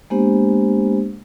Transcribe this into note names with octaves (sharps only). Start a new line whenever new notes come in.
G#3 A#3 B3 D4 G4 C5